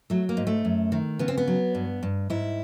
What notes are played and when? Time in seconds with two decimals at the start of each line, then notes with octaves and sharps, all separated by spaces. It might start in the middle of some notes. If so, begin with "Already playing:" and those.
0.10 F#3 A3
0.29 A#3
0.37 G#2
0.47 A3
0.65 F#2
0.92 D#3
1.19 C#3 B3
1.28 C4
1.38 B3
1.48 F#3
1.75 G2
2.03 G2
2.30 G#2 E4